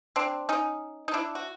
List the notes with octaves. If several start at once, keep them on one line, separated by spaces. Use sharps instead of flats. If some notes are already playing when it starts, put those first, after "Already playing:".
C4 D4
C#4 D#4
D#4
D4 E4
F#4